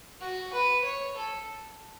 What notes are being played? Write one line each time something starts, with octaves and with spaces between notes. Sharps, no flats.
F#4
B4
C#5
A4